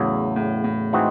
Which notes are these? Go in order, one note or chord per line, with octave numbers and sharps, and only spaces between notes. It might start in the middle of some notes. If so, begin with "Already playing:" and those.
Already playing: E2 A2 C#3 F#3
A2
A2
E3 G#3 C4 D#4 F#4